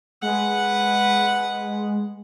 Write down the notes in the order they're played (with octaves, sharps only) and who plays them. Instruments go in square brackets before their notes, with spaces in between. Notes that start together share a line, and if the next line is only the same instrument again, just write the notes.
[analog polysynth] G#3 [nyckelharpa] B4 F#5